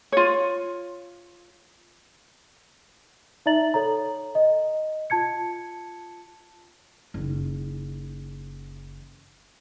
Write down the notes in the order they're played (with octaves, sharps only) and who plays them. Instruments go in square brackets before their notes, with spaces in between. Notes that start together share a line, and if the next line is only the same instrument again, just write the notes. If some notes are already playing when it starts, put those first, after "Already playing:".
[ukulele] F4 C#5
[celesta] D#4 D5 E5 A#5 A6 F#7
A4 C#5 A#5
D#5
F4 A5 G#6 C#7
[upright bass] F#1 D#3